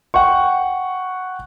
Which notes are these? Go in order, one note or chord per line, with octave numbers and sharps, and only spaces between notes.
F#5 G5 C#6